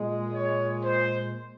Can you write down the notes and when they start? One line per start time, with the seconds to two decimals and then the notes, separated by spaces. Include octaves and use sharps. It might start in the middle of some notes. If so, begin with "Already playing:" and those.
Already playing: A#2 G#3
0.34 C#5
0.84 C5